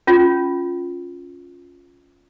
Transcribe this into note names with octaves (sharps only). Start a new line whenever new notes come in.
C#4 F4